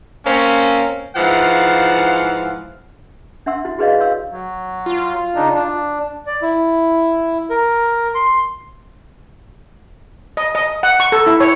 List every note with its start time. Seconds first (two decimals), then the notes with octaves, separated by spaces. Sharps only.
0.26 A#3 C4 C#4
1.16 G#2 E3 F3 F5 F#5
3.46 D4 E5 F#5 C6 E6
3.65 E4 F#4
3.79 F#4 G#4 B4 D5 D#5 F5
4.00 F#4 C#5 F5 E6
4.31 F#3
4.86 F4
5.35 C#3 D4 D#4
5.55 D4
6.27 D5
6.42 E4
7.50 A#4
8.15 C6
10.37 D#5
10.55 D#5
10.83 F#5
11.00 C#6
11.12 A4
11.27 E4
11.40 C#5